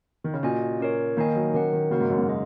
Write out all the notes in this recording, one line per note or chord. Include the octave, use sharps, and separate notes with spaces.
D#3
C#3
A#2 C#4 F#4 D#5 G#5
C#4 A#4 C#5
D#3 A#3 D#4 A#4 D#5 G#5
F#3
D#3 C#4 A#4 F#5
D#3
C#3 A#3 F#4 A#4 F#5
G#2
F#2
G#2
G#4 D#5